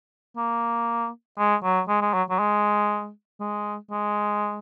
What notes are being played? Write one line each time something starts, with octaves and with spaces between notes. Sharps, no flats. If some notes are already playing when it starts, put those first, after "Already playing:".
A#3
G#3
F#3
G#3
G#3
F#3
F#3
G#3
G#3
G#3